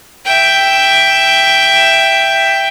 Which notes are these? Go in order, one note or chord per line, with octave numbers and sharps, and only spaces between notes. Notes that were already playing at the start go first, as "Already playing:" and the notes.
E5 G5